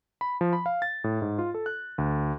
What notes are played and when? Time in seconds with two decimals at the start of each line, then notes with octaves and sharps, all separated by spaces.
0.21 B5
0.41 F3
0.53 B5
0.66 F5
0.82 A6
1.04 A2
1.22 G#2
1.39 F4
1.54 A4
1.66 F#6
1.98 D2